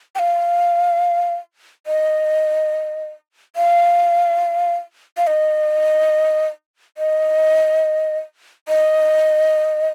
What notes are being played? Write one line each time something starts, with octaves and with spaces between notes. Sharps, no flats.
G5
F5
D#5
F5
F5
D#5
D#5
D#5